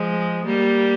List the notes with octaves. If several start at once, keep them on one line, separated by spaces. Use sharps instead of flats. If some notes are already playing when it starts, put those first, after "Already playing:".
Already playing: F3 G#3
G3 A#3